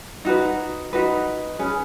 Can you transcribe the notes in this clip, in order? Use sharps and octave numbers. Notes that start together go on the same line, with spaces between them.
D#4 F#4 B4
D#4 F#4 B4
C#4 G#4 B4